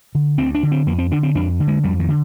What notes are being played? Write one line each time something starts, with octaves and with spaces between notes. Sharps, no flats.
D3
D2 C4
D4
D3
C4
F2 A#3
C4
D3 D4
C4
F2 D4
D3
G#3
F2 G3
D#3
D3